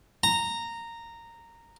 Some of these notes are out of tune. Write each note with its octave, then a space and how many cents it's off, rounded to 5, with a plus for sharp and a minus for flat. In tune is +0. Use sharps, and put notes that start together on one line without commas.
A#5 -10